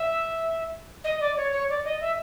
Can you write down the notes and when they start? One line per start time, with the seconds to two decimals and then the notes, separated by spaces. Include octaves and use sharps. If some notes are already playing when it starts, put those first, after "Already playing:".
Already playing: E5
1.04 D#5
1.20 D5
1.36 C#5
1.52 C#5
1.69 D5
1.84 D#5
2.00 E5